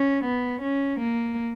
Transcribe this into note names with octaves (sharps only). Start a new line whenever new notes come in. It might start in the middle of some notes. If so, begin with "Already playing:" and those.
Already playing: C#4
B3
C#4
A#3